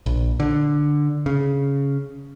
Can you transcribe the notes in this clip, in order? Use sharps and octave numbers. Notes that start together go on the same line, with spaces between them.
A#1
D3
C#3